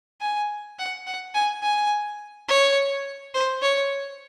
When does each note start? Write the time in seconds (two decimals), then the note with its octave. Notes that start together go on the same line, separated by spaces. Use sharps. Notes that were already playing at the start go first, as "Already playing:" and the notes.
0.21 G#5
0.79 F#5
1.07 F#5
1.35 G#5
1.63 G#5
2.49 C#5
3.34 C5
3.62 C#5